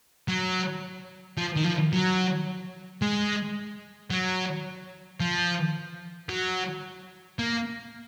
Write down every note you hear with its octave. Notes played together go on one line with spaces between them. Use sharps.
F#3
F3
D#3
F3
F#3
G#3
F#3
F3
F#3
A#3